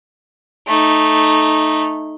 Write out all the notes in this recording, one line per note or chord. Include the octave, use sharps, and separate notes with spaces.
A3 D#4